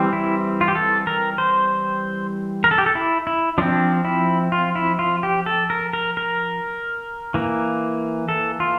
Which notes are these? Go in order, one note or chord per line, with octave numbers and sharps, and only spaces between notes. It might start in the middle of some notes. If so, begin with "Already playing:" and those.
Already playing: E3 G3 C4
E4
F4
G4
A4
A#4
C5
A#4
A4
G4
A4
E4
E4
F3 C4 D4
E4
F4
E4
F4
G4
A4
A#4
A#4
A#4
E3 A#3
A4
F4